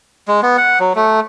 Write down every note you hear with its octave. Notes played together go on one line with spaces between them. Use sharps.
G#3
B3
F#5
F#3
A3